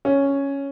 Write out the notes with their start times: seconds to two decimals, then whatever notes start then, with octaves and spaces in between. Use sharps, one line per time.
0.05 C#4